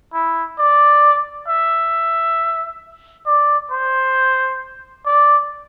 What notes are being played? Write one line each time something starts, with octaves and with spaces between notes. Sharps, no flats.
E4
D5
E5
D5
C5
D5